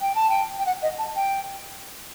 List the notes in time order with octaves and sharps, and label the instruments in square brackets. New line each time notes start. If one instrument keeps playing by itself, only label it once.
[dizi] G5
A5
G5
G5
F#5
D#5
A5
G5